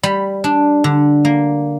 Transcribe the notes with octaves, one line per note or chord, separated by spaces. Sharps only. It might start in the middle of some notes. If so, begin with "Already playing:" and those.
G3 B5
D4
D3
A#3